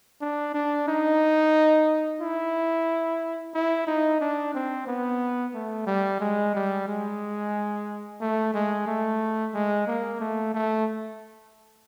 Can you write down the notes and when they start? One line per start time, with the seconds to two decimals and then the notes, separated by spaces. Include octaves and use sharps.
0.21 D4
0.54 D4
0.88 D#4
2.21 E4
3.54 E4
3.87 D#4
4.21 D4
4.54 C4
4.87 B3
5.54 A3
5.87 G3
6.20 G#3
6.55 G3
6.88 G#3
8.21 A3
8.54 G#3
8.87 A3
9.54 G#3
9.87 A#3
10.20 A3
10.54 A3